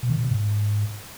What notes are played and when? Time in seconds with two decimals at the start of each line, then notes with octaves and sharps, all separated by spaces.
0.03 B2
0.10 D#3
0.17 A#2
0.24 C3
0.31 G#2